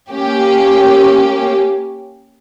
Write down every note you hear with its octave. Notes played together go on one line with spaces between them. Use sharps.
A#3 C#4 G4